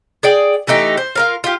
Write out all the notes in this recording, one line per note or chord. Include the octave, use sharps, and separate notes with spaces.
G#4 D5 G5
E3 A3 D#4 G4
C5
F4 A#4 F5
F4 G4